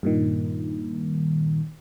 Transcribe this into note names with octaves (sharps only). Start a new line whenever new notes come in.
G2 A#2 D#3